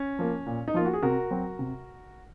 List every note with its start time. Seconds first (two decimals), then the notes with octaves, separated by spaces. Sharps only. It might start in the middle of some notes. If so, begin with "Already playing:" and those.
Already playing: C#4
0.19 F3 A#3
0.46 A#2
0.68 D#4
0.74 F3 A#3 F4
0.85 F#4
0.93 G#4
1.03 C3 F#4 A#4
1.31 F#3 C4
1.59 C3